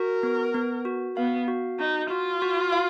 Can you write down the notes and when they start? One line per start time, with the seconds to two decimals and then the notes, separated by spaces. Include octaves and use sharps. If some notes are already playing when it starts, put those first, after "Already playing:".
Already playing: F#4 A#4
0.23 B3
0.55 B3
0.85 F#4
1.17 B3 F5
1.48 F#4
1.79 D#4 F#4
2.10 F4 F#4
2.42 F#4
2.72 F5